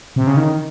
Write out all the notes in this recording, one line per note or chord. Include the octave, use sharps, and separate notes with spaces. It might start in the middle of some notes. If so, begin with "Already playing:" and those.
C3
C#3
D#3